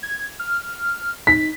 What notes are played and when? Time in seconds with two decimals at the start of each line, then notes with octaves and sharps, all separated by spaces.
0.03 G#6
0.39 F6
1.27 D#4 B6